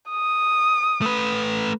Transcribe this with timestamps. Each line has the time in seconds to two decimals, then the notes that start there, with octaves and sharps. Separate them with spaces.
0.10 D#6
1.02 A3 B4